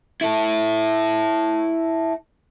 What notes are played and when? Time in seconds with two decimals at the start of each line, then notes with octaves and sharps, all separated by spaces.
0.21 E4 A4